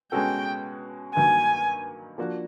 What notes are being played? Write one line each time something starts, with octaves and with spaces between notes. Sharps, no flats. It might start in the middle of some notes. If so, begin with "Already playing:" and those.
B2 G#3 C#4 F#4 A4 G5
G2 D#3 F#3 A#3 G#5
F3 A#3 D4 F#4